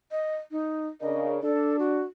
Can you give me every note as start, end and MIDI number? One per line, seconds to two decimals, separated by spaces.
0.11 0.36 75
0.51 0.87 63
1.01 1.38 49
1.01 1.38 62
1.01 1.38 70
1.01 1.27 75
1.42 2.01 62
1.42 1.77 69
1.79 2.03 66